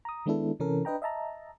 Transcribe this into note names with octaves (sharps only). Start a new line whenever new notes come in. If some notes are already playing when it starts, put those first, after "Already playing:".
A#5 D#6
D#3 G#3 B3 D4 E4 A4
C3 E3 C#4 A4 A#4
D4 B4 D#5 G5 A#5
D#5 E5 A5 A#5